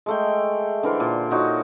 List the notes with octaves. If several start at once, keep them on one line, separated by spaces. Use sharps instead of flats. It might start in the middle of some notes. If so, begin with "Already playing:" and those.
G#3 A3 G5
D3 E3 A#4 C5
A#2
D#4 F#4 C#5